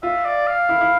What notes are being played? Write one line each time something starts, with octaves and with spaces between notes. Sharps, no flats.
F4 E5
D5
F5
E4
E4